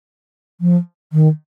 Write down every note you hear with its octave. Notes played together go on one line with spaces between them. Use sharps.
F3
D#3